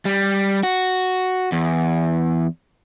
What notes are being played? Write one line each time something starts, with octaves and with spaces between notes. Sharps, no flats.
G3
F#4
E2